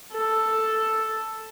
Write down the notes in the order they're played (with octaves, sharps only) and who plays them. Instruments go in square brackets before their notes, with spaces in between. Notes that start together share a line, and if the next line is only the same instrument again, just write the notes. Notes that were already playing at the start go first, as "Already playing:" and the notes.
[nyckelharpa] A4